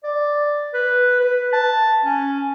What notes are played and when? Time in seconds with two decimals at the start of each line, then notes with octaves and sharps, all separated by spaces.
0.04 D5
0.74 B4
1.20 B4
1.53 A5
2.05 C#4